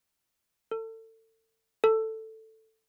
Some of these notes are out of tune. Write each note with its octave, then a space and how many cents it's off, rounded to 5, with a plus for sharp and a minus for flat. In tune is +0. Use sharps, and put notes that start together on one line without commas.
A4 +30
A4 +10